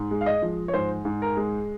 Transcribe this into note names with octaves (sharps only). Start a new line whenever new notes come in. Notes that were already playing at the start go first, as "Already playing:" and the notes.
Already playing: G#2
G#3
F5
D#5
F3
C#5
G#2 C5
G#2
A#4
G#3